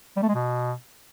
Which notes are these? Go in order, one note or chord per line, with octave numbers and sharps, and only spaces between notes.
G3
A3
G#3
B2